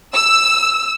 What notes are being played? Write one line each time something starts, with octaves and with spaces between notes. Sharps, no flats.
E6